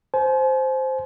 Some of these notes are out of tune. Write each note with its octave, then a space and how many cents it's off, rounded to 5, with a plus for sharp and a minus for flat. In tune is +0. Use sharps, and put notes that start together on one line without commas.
C5 +0 G#5 +45